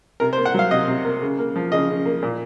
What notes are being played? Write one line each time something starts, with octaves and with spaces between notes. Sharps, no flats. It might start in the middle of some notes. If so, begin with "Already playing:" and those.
C3 A#4
C5
A#3
F#5
F#3 F5
C3 D#5
C3
A#3
C#3
A#3
F3
C#3 D#5
C#3
A#3
A#2